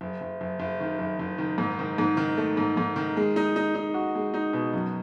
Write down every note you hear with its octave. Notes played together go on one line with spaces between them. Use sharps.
F#1
F#1
F#1
F#1
D#3
F#1
F#1
D#3
G#2
D#3
G#2
D#3
A3
G#2
G#2
D#3
G#3
D#4
D#4
D#4
F#4
G#3
D#4
B2
F#2